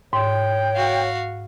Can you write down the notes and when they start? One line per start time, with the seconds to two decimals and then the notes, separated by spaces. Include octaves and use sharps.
0.13 G#2 C#5 G5
0.75 F#4 F5